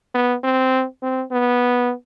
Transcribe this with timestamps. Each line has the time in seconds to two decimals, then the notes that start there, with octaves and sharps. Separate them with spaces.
0.14 B3
0.43 C4
1.03 C4
1.31 B3